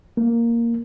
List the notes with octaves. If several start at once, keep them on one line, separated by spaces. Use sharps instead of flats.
A#3